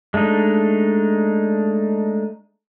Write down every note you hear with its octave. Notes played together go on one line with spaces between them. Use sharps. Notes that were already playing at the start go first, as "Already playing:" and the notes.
G#3 A3 D4 D#4